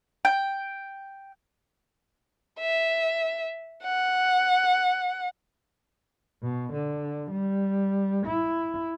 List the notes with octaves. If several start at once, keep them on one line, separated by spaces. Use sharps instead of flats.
G5
E5
F#5
B2
D3
G3
E4